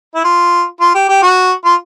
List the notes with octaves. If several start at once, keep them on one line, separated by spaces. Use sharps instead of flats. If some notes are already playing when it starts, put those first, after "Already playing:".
E4
F4
F4
G4
G4
F#4
F4